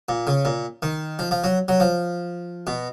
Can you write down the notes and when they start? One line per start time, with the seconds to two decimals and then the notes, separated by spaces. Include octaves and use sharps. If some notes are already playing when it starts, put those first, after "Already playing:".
0.09 A#2
0.27 C#3
0.45 A#2
0.82 D#3
1.19 F3
1.31 F3
1.44 F#3
1.68 F#3
1.80 F3
2.67 B2